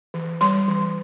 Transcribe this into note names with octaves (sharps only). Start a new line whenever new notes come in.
E3
G3 C6
E3